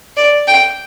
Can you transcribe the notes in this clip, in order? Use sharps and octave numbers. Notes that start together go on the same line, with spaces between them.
D5
G5